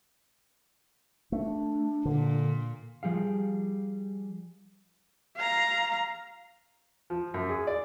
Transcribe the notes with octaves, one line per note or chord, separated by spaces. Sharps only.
A3 D4
A#2 D3
F3 G3 G#4 F5
F5 A#5
F3
F#2
G#4
D5